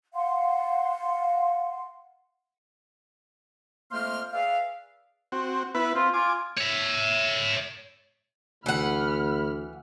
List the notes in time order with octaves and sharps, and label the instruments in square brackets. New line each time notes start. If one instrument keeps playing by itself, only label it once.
[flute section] F5 F#5 C6
[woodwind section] F2 A3 A#3 C5 C6 F6
G#4 B4 D5 E5 F5
[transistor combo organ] C4 F#4
B3 E4 B4
[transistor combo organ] C4 [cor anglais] F4
[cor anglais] F4 [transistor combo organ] G#5 D6
[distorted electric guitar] C#5 E5
[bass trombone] D2 [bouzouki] E3 F#5 [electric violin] B5 F6